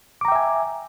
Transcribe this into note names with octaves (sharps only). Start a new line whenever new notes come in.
E5 G5 G#5 A#5 D6